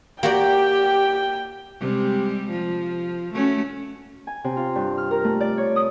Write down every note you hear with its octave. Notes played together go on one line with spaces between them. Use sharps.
A#3 F#4 G4 D5 G5
C3 G3 G#3
F3
A3 C#4 F#4
G#5
C3
F4
G2
F6
A#4
A3
D5
C#5
D#6